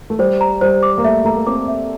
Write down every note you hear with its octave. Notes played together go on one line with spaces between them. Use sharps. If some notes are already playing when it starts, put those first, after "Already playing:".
A3
G3 C5
A#5
G3 C5
D6
A#3
A3 E5
A3 A#5
A#3
C4 D6
E5